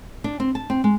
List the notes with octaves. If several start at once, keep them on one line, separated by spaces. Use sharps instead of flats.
D4
C4
A5
C4
G#3